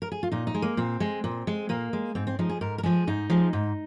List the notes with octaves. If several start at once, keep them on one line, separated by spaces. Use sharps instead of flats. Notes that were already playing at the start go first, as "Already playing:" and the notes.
A#4
G#4
F4
A#2 D#4
D#4
G#3
A#3
A#2 C4
G#3
A#2
G#3
A#2 A#3
G#3
G#2 C4
C4
F3 G#3 D#4
G#4
G#2 A#4
A#4
F3 G#3 G#4
G#2 D#4
F3 G#3
G#2